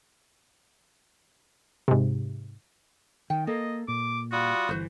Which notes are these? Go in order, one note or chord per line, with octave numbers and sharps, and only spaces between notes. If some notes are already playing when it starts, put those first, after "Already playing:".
G#2 C3
D#3 G5
A#3 A4 D#5
A#2 D6
G3 F4 F#4 D#6
G1 E3 B4 C5